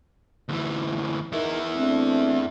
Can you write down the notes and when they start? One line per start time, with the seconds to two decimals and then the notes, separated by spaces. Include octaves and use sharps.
0.49 D2 E3
1.32 E2 D#4 E4 A#4
1.76 A3 C4 D4